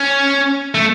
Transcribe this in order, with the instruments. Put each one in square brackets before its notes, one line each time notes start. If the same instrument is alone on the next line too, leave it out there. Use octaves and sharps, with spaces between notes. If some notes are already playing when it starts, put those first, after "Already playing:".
Already playing: [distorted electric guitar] C#4
A3